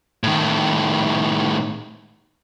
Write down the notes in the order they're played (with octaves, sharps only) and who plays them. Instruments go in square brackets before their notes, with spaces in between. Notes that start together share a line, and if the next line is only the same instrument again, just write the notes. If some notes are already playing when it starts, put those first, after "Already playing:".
[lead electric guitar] A2 D#3